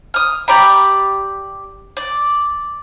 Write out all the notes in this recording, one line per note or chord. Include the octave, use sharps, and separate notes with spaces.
D#6 F6
G4 D5 A#5 B5
D5